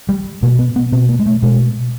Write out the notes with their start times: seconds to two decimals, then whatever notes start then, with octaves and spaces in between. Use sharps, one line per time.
0.09 G3
0.43 B2 A#3
0.59 B3
0.76 B3
0.92 B2 C4
1.09 A#3
1.19 G#3
1.26 A3
1.42 B2 G#3